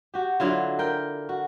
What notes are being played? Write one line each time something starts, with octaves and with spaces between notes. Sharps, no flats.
F#4 G4
D3 F#3 E4 F4
A#4 G5
F#4